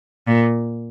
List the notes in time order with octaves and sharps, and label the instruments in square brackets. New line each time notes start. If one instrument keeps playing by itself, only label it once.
[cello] A#2